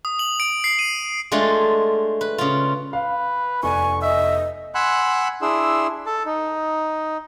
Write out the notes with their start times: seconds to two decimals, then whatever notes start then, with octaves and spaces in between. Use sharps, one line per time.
0.05 D#6
0.19 F#7
0.40 D7
0.64 C7
0.79 D#7
1.32 G#3 A3 D4 F4
2.21 B4
2.38 C#3 F4
2.93 B4 F5
3.63 F1 B3 D5 G#5 C#6
4.02 D#5 E5
4.75 F#5 G#5 B5 C6 E6 F#6
5.42 D4 E4 G#4 C6 E6
6.06 A4 A5
6.26 D#4